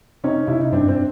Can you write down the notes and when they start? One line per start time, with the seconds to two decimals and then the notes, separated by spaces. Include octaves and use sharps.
0.24 C3 C#4 D#4
0.47 C3 E4
0.60 D#4
0.72 G2 C4 D4
0.88 C4 D4